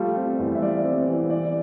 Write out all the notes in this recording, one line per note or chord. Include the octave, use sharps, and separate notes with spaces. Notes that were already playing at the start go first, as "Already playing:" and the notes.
Already playing: F3 G3 A3 F4
C4
E2
E5
G3 D5
C4
E3
E3 D5